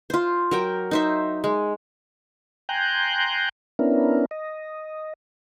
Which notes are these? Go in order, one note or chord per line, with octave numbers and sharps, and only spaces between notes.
F4 C5
F#3 A#4 G5
D#4 C5 E5
G#3
G5 G#5 A#5 C6 F#6 G6
B3 C#4 D4 E4 A#4
D#5